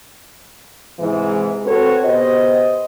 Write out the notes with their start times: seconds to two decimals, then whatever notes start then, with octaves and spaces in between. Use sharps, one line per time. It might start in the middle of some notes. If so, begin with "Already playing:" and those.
1.00 G#2 C3 E3 G#3
1.65 C4 F#4 A4 B4 C#5
2.04 B2 G4 C5 D#5